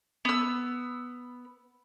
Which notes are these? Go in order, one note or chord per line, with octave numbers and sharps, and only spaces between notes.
B3 E6